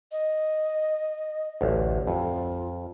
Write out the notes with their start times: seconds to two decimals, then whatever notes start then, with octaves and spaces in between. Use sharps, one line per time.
0.12 D#5
1.61 A1 D2
2.07 F2 F4